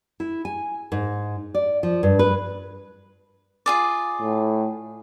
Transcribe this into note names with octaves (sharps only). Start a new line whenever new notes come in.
E4
G#5
G#2
D5
F3
G2
B4
F4 G#4 D5
A2